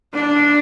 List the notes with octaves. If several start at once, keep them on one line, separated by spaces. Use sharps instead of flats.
D4